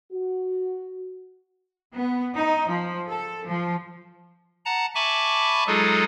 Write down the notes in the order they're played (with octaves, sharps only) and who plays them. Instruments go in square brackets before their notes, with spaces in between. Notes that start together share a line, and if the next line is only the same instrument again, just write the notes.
[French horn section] F#4
[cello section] B3
D#4
F3
A4
F3
[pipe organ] F#5 A5 A#5
E5 G#5 A5 B5 C#6 D6
F#3 G#3 D#4 F4 G#4 A4